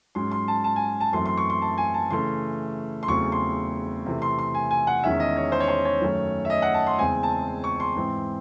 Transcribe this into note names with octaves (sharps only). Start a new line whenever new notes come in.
G#2 F#3 C#4 C6
C6
A5
A5
G#5
A5
F#2 E3 A3 C4 C6
C6
C#6
C6
A5
G#5
A5
C#3 E3 A3 C#4 C6
C6
E2 C#3 F#3 A3 C4 C#6
C6
C3 E3 A3
C6
C6
G#5
G#5
F#5
E2 D#3 G#3 C#4 E5
D#5
C#5
C5
C#5
C5
C#5
F#2 D#3 A3 C#4
E5
D#5
F#5
A5
C6
E2 C#3 G#3 C4 G#5
A5
C#6
C6
G#2 E3 C4